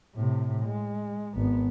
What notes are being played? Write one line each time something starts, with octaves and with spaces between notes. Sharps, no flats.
A2 C3
G#3
G#1 B3